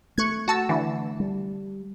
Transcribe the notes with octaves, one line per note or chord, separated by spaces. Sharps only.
A3 C#6 F#6 G#6
F#4 A5 E6
D3 E3
G3